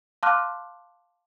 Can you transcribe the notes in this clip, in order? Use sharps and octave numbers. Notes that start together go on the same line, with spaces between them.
F5 A5 C6 D6 F6 F#6